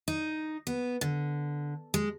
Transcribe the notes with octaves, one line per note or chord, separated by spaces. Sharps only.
D#4
B3
D3
G#3